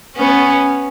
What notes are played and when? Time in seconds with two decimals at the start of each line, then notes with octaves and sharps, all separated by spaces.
0.16 B3 C#4